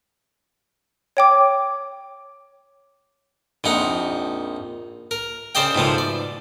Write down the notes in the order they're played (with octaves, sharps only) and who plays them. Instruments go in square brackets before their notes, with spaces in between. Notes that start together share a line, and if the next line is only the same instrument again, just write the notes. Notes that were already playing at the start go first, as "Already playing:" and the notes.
[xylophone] C#5 G5 D6
[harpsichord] A#1 F2 D#4 F#5
A#4
C#3 C5 D5 D#5 G5
G#2 B2 F3 A3
D5